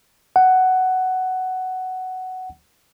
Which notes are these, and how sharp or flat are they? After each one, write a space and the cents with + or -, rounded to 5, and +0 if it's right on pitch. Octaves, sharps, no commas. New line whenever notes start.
F#5 +10